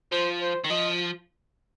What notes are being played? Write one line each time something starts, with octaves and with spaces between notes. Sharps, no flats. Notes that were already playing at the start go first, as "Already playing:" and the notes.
F3 C5
C5
D#3
F3 D#5